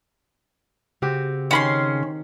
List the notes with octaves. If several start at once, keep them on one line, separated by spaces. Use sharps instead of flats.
C#3 C4 F#4 G4
D#3 C#4 B5 C6